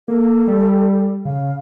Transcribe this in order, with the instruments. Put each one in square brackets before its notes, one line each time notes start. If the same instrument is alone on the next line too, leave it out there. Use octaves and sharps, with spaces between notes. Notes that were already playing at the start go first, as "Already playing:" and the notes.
[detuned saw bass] A#3 [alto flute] A4
[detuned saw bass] G3
[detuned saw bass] C#3 [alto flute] F5